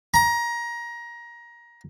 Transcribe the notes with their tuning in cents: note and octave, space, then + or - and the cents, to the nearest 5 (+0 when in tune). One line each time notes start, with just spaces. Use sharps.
A#5 +20